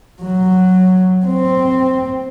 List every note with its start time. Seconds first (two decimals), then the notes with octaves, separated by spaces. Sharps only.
0.22 F#3
1.26 C4